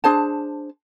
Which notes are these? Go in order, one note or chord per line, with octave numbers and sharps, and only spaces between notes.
D4 G#4 C5 A5